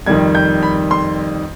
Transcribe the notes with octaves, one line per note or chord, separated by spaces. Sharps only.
F2 D#3 G3 G#6
G6
B5
C6